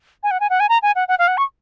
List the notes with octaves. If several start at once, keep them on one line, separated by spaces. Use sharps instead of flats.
G#5
F#5
G#5
F#5
G#5
A#5
G#5
F#5
F#5
F5
F#5
C#6